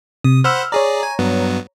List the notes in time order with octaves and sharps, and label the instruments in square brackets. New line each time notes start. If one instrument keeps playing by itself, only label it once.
[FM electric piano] C3 [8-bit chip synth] D#6
[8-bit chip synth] C5 F#5 B5 [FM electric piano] E6 F6
[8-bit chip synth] G#4 D5 [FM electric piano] C#5 A#5
[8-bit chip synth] G#5
G2 F#3 B3